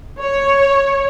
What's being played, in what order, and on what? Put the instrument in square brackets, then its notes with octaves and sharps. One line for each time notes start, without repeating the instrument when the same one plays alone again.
[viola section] C#5